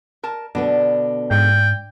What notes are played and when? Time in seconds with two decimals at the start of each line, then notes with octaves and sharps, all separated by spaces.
0.23 A#4 A5
0.55 B2 D3 B3 D4
1.31 G#2 G5